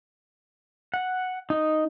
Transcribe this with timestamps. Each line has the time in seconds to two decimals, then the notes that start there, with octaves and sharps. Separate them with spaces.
0.94 F#5
1.50 D#4